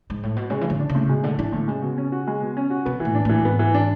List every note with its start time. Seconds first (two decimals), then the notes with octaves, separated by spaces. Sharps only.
0.10 G#2
0.23 A2
0.36 B2
0.50 C#3 G#3
0.61 A2 E3
0.70 D3
0.80 D4
0.89 C#3
0.95 A2
1.09 B2 G#3
1.23 A2 D3
1.39 E3 D4
1.53 A2 D3
1.68 C#3 G#3
1.82 B2
1.98 C#4
2.12 F#4
2.27 G#3
2.41 B2
2.57 C#4
2.70 F#4
2.86 B2 B3
3.00 A2 E3
3.15 D4
3.25 A2 E3
3.45 G#2 B3
3.59 E3
3.74 D4